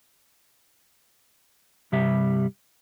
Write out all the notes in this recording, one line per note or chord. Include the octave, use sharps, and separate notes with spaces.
G2 C3 G3 G4 E5